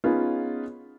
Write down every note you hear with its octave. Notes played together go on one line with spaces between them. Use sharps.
B3 C#4 D#4 F4 G#4 B4